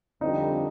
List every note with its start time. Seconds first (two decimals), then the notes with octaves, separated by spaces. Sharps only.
0.21 F2 D3 G3 C4 D#4 F4